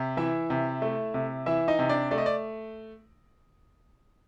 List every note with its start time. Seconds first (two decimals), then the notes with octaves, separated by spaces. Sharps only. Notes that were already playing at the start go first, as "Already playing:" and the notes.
Already playing: C3
0.17 E3 E4 E5
0.50 C3
0.82 A3
1.14 C3
1.46 E3 E4 E5
1.68 D#4 D#5
1.79 C3
1.89 D4 D5
2.11 A3 D5
2.18 D#5
2.26 D5